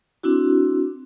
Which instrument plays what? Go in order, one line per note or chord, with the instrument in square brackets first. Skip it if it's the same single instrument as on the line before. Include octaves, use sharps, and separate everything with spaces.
[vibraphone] C4 D4 E4 F#4